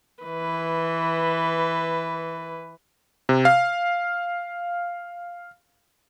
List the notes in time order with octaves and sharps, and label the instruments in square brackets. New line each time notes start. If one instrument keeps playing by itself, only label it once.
[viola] E3 B4
[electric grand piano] C3
F5